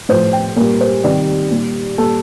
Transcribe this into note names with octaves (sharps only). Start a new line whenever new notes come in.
A2 F3 C5
G5
A#2 G3 A#4
C5
C3 D#3 G3 D5
A#2 G3
A#2 G3 A4